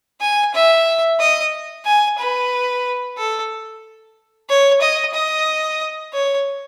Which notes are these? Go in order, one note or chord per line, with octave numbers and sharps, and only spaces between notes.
G#5
E5
D#5
G#5
B4
A4
C#5
D#5
D#5
C#5